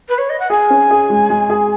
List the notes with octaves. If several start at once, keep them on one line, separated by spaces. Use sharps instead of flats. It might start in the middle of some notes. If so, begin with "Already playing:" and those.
B4
C#5
D#5
F#5
G#4 G#5
C#4
G#4
G#3
G#3
G#4